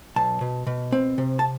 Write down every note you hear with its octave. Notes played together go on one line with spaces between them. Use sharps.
B1 A5
B2
B2
C4
C3
A5